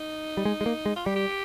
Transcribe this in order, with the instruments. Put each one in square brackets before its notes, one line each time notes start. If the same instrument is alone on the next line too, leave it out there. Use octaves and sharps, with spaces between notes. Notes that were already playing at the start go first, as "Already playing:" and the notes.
Already playing: [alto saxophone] D#4
[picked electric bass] G3
G#3
G#3
A#3
G#3
[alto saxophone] F4
[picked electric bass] G3 [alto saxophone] G4
[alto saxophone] G4